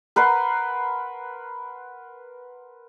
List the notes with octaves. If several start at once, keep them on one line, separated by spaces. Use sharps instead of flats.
A#4 B4 F#5 C6